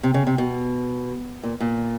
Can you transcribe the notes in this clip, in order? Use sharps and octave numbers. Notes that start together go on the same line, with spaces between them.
C3
C#3
C3
B2
A#2
A#2